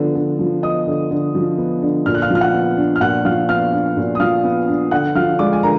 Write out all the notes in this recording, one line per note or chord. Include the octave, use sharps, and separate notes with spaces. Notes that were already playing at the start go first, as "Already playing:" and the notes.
Already playing: D3 F3 B3
D3
F3
B3 D#5 D#6
D3
D3
F3
B3
D3
A#2 F6
F#6
F5 F6
F3
F6
F#5 F#6
B3
D4
F6
A#2 F#5 F#6
F3 F5 F6
B3 F5 F6
D4
A#2
D#6
F3 F5 F6
B3
D4
D3 F#5 F#6
F3 F5 F6
G#3 D5 D6
G#5
D3 A#4 A#5